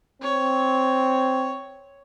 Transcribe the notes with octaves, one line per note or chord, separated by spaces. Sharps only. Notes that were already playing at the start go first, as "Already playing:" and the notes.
C4 C#5